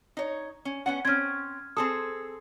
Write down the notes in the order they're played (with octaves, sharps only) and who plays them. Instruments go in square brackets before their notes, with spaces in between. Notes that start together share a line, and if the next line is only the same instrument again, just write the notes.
[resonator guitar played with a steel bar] D#4 C#5
C#4
B3 C#4 F#5
[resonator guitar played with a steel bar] C4 C#4 [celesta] F6 G#6
[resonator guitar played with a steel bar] C4 G#4 A4 [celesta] D#6